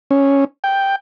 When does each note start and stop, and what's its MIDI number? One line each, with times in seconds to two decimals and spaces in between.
0.11 0.45 61
0.64 0.96 79